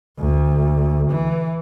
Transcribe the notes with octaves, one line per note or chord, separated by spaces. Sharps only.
D2
E3